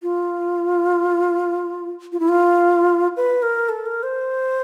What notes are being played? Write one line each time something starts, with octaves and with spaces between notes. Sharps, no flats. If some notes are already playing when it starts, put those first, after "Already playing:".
F4
F4
E4
F4
B4
A#4
A4
A#4
C5